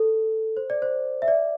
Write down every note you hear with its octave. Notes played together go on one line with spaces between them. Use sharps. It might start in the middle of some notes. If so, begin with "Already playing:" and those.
Already playing: A4
C5
D5
C5
E5
D5